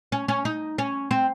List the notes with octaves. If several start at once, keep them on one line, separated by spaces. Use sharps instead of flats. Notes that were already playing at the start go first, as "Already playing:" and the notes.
C#4
C#4
D#4
C#4
C4